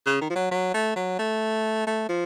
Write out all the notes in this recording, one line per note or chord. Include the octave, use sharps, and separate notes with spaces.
C#3
D#3
F3
F#3
F#3
A3
F#3
A3
A3
F3